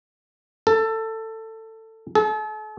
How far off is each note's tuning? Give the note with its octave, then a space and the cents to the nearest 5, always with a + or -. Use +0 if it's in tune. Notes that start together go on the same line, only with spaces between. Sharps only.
A4 +20
A4 -40